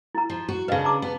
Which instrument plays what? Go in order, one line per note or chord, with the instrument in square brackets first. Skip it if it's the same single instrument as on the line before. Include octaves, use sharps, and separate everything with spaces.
[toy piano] E4 A#5
[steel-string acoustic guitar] F3
F#4
[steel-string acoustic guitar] C#3 D4 [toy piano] B4 D#5 F5
[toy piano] A5 A#5 D6
[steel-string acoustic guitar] B3